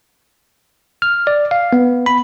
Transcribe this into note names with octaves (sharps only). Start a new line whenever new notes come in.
F6
D5
F5
B3
B5